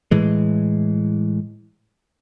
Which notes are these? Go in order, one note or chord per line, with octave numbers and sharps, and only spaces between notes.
A2 E3 G#3